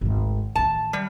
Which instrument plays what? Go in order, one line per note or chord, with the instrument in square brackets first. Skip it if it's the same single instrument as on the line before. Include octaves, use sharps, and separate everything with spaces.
[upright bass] G#1 D2
[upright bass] A1 D#3 [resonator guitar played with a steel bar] A5
[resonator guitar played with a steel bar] G3